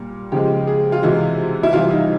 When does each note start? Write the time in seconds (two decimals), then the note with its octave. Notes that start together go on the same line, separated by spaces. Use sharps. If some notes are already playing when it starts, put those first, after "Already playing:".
Already playing: A#2 G3
0.32 C#3 F3 G#3 G4
0.67 G#4
0.92 F4
1.03 C3 E3 G#3 F#4
1.63 E4
1.73 C3 E3 G3 F4
1.90 D#4